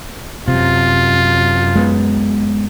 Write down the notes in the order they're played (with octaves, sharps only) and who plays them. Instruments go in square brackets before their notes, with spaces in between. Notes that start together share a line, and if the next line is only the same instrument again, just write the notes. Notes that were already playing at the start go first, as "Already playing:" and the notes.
[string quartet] F#2 [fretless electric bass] C3 [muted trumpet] F4
[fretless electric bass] G#3 B3